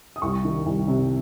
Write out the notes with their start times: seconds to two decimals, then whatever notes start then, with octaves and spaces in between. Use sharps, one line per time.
0.16 D#6
0.22 C2 C#6
0.44 D#3
0.66 C2
0.88 C3